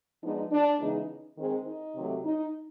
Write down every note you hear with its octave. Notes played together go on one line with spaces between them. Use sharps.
F3 G#3 B3 D4 D#4
D4
C#3 E3 G#3 B3 D#4
D#3 G#3 C4
D#4
C3 D#3 F#3 A3
D#4